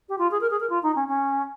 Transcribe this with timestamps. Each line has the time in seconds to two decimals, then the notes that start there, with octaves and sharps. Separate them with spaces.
0.09 G4
0.18 F4
0.31 G#4
0.41 A#4
0.50 G#4
0.60 A#4
0.69 F4
0.83 D#4
0.95 C#4
1.08 C#4